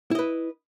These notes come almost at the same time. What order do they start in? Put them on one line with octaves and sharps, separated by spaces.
E4 D#5 B4